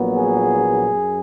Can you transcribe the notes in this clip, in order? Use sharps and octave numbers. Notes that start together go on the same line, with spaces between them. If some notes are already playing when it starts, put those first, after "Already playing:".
Already playing: A#1 A#2 F#3 B3
G#4
F#2